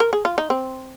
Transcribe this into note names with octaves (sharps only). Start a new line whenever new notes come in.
A#4
G#4
F4
D#4
C4